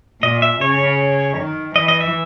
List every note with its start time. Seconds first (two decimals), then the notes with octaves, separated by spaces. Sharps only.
0.22 A#2 D#5
0.42 E5
0.61 C#3 C#5
1.37 D#3
1.75 E3 D#5
1.88 D#5
2.01 E5